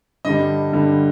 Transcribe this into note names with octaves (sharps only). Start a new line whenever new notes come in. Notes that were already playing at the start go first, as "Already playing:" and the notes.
G2 D3 G3 D#5
G2 D3 G3